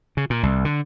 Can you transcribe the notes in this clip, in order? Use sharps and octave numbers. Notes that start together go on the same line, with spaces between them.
C#3
A#2
C2
D3